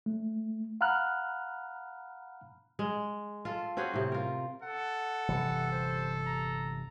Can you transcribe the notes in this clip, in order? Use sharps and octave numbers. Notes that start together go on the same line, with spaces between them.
A3
F5 F#5 A#5 B5 F6 F#6
G#3
F4 A4
C4 C#4 F#4 G#4
A2 C3
F4 A#4
A4 F#5
G1 C3 E3
C5
A#5